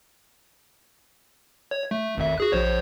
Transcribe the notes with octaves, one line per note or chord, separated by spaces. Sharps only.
C#5
A3
G#1 F2 E5
F#4 G#4 F#6
A#1 C5 C#5